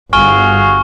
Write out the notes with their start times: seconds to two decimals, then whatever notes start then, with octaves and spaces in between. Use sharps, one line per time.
0.13 G1 F#4 G#4 F5 G#5 C#6 F6 G7